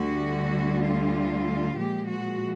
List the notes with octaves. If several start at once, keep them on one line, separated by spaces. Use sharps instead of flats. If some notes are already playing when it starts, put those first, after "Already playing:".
Already playing: D2 D3 G3 F#4
F4
A#2 F3 G#3 G4
F#4